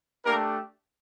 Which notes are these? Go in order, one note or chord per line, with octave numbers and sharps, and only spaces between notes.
A3 A#3 D4 G4 A#4